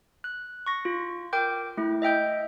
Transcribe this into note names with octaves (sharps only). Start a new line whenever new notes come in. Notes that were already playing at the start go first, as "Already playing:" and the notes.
F#6
C#6 A#6
F4
A#4 G5 D6 G6
A3 E4
D#5 E5 G5 G6